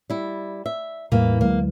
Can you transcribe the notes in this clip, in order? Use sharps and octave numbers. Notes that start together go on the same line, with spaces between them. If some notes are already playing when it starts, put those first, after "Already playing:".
G3 E4
E5
E2 A2 E3 G3 A#3
D2 F#3 G#3 A#3